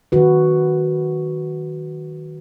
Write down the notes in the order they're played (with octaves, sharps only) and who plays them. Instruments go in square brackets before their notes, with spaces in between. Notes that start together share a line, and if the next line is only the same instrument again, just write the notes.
[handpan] D#3 F#3 F#4 B4